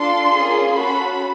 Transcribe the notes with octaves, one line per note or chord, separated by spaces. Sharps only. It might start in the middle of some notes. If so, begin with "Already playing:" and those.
Already playing: D4 F4 A4 C6
A#3 C#4 F4 G#4
C#4 F#4 A4 B5